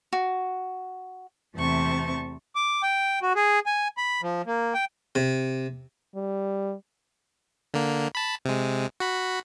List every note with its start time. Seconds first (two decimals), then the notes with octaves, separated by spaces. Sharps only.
0.13 F#4
1.55 E2 C3 A3 C4 A5 C#6
2.55 D6
2.83 G5
3.22 F#4
3.36 G#4
3.66 G#5
3.97 B5
4.23 F3
4.46 A#3
4.74 G5
5.15 C3
6.15 G3
7.74 D3 A#3
8.15 A5 B5
8.45 C3 G#3
9.00 F#4 B5